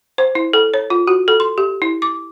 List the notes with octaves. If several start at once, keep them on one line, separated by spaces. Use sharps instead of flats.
C5
E4
A4
C#5
F4
F#4
A4
C6
G4
E4
D6